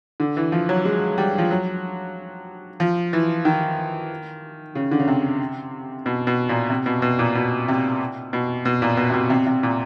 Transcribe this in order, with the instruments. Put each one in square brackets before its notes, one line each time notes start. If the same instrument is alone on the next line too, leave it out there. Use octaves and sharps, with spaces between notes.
[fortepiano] D3
E3
F3
F#3
G#3
G3
F3
F#3
F3
E3
D#3
C#3
D3
C#3
C3
B2
B2
A#2
C3
B2
B2
A#2
B2
C3
B2
B2
A#2
B2
C3
B2
C3
C3
A#2